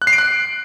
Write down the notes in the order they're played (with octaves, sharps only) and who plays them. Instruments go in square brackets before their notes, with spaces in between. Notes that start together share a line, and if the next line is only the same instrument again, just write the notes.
[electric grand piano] F#6
C7
D7
F#6